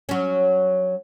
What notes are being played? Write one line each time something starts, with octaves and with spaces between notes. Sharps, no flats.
F#3 C#4